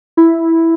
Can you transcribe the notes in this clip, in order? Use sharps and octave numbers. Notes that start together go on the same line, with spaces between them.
E4